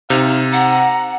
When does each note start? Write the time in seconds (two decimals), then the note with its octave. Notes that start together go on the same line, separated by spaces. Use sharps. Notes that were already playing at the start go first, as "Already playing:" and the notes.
0.10 C3 D#4 F5
0.53 F#5 A#5